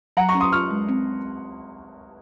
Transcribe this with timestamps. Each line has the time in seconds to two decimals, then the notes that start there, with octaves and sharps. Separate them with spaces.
0.17 F#3 F#5 A#5
0.29 A#5 C#6
0.35 C#4
0.40 C6 D#6
0.52 F4 C#6 F6
0.71 G#3
0.89 C4